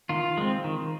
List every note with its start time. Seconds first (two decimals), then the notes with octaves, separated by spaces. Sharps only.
0.09 D#3 F4
0.38 G#3 C4
0.64 D#3